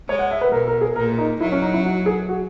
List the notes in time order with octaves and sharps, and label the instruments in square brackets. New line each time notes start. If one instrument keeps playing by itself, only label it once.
[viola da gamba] G#3 [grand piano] C#5
[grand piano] F#5
E5
B4
[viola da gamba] B2 [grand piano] A#4
[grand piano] A#4
G#4
[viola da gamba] A#2 [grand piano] A#4
[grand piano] D#4
[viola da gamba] F#3 [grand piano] E4
[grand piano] C#4
D#4
E4
F#4
G#4
F#4